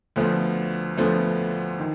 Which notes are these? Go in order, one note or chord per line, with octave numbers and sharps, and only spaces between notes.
D2 D3 F3 B3
D2 D3 F3 B3
D#3